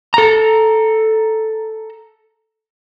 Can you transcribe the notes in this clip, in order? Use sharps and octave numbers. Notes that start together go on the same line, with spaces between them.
A4 A#5